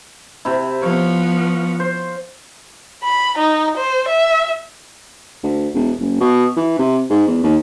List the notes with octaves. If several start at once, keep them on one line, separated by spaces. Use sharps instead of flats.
C3 E4
F3 B3 C#5 F5
C5
B5
D#4
C5
E5
D2
E1
F#1
B2
E3
C3
G#2
E2
D#2